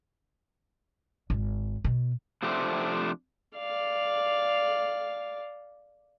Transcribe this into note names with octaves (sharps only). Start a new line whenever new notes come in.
G#1
B2
C3 F3 A3 C4 D4
D5 F5